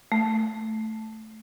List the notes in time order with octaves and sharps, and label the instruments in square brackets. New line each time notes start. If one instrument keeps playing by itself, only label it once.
[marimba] A3